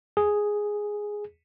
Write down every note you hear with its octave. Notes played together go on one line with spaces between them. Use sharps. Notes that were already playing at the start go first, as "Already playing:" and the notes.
G#4